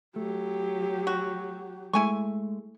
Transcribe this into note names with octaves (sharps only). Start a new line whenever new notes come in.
F#3 A3 G4
F#4
G#3 A3 E4 G#5 C#6